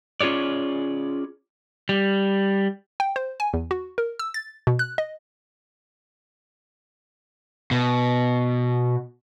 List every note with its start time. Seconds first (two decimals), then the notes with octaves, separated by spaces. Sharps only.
0.21 C#4 F4 G#4 C#5 D5
1.89 G3
3.00 G5
3.16 C5
3.40 G#5
3.53 E2
3.71 F#4
3.98 A#4
4.19 E6
4.34 A6
4.67 B2
4.79 F#6
4.98 D#5
7.71 B2